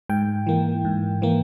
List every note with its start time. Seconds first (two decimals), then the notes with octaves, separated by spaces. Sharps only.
0.09 G#2 G5
0.47 E3 A#3
0.85 G#2
1.22 E3 A#3